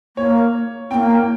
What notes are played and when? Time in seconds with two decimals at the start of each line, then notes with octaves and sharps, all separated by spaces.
0.17 A#3 C#5
0.91 C4 G5
0.94 A#3
1.10 G5